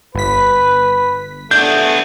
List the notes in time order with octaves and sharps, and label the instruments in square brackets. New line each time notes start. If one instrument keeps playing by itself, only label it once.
[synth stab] G1 B6 [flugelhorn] B4
[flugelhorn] A3 [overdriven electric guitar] B3 D4 [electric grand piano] G6